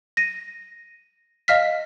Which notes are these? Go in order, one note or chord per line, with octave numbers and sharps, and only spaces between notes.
A#6 D#7
D#5 F5 F6 B6